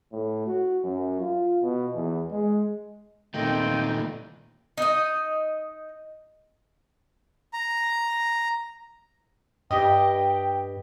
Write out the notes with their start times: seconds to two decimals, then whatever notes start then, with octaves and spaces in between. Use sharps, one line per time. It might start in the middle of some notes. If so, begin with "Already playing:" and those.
0.13 A2
0.47 F#4
0.84 F#2
1.20 F4
1.62 B2
1.95 E2
2.31 G#3
3.34 A#2 D#3 A3 C4 D#5 G5
4.78 D#4 D#5
7.53 A#5
9.71 G2 G4 D#5 G5